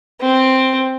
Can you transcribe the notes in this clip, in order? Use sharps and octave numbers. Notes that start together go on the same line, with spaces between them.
C4